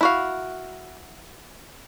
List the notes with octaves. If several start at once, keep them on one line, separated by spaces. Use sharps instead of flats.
E4 F#4 F5